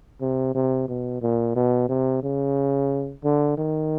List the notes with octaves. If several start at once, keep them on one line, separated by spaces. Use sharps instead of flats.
C3
C3
B2
A#2
B2
C3
C#3
D3
D#3